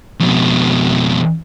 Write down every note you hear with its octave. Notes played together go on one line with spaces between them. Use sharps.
F2 B2